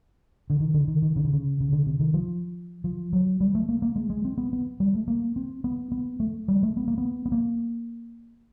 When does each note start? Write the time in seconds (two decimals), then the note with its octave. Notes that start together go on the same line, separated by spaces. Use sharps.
0.50 D3
0.60 D#3
0.74 D3
0.88 D#3
1.02 D#3
1.16 C#3
1.24 D3
1.33 C#3
1.60 C#3
1.72 D3
1.86 C3
2.00 D#3
2.14 F3
2.84 F3
3.13 F#3
3.40 G3
3.55 A3
3.69 A#3
3.82 A#3
3.96 G#3
4.10 G#3
4.25 C4
4.38 B3
4.53 B3
4.80 G3
4.95 A3
5.08 A#3
5.36 C4
5.64 B3
5.92 B3
6.20 A3
6.48 G3
6.63 A3
6.77 B3
6.88 A#3
6.98 B3
7.26 B3
7.32 A#3